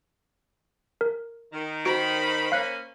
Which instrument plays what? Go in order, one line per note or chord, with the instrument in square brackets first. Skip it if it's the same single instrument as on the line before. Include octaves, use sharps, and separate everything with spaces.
[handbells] A#4
[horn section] D#3
[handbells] F#4 D7 [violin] C5 B5
[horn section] A#3 C#4 [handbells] F5 F#6